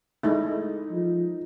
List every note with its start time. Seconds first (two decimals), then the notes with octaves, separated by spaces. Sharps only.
0.23 G#3 A3 D#4 E4
0.92 F3